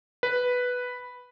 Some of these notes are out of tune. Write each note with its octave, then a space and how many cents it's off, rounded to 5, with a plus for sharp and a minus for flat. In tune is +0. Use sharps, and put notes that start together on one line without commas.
B4 +0